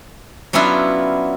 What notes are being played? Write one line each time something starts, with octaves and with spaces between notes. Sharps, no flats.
F#3 B3 C#4 D4 E4 F4